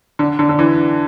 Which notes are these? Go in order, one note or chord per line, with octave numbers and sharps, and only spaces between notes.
D3
D3
D3
E3